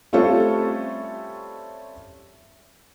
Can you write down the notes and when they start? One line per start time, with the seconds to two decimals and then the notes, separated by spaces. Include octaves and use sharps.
0.13 G3 A3 C4 C#4 F4 A4